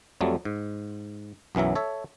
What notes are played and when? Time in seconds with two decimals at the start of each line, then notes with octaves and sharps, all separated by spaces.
0.21 F2 F#3 G3 A3
0.45 G#2
1.55 B1 F#2 E3 F#3 E5
1.75 A4 C#5 E5